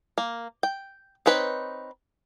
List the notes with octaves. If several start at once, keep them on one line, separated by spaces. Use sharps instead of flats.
A#3
G5
C4 D#4 B4 C#5